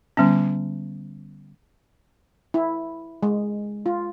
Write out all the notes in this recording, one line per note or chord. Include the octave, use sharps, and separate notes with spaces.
D3 G3 B3 C#4
E4
G#3
F4